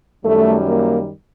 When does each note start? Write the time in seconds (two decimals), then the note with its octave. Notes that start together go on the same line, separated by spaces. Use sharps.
0.25 F#2 D#3 G3 A3
0.68 A#3